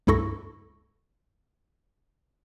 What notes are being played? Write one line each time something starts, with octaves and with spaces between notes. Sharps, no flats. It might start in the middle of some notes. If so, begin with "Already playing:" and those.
C#2 G2 E4 A4 C#6 A#6